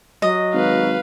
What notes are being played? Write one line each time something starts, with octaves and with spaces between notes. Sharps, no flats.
F#3 D#5
G#1 B4 F5